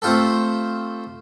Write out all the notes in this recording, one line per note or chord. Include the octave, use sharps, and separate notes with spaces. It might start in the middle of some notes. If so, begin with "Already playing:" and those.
A3 C4 F4 G4 A4